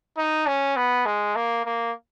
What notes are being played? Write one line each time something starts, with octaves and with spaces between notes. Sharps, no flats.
D#4
C#4
B3
G#3
A#3
A#3